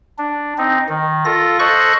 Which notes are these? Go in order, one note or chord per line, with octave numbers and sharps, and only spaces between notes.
D4
C4 D#4
D#3
F4 A4 A#6
A4 C5 D#5 C#6 F#6